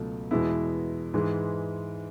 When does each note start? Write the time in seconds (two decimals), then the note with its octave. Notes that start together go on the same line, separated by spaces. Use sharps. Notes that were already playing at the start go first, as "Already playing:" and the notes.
Already playing: C#2 B2 F#3 A3
0.31 E2 B2 G#3 B3 E4
1.14 G#2 E3 G#3